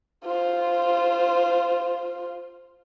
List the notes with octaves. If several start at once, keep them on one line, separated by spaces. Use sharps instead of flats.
F4 C5